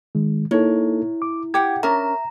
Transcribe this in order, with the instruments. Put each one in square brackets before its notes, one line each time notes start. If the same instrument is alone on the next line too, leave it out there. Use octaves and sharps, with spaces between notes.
[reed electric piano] D#3 G#3
[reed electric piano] A#3 D#4 A4 [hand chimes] E4 [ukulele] C#5
[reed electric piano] D6
[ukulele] G4 F#5 [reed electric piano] D6 G#6
[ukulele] C#4 D4 A#4 [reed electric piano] E5 [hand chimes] A#5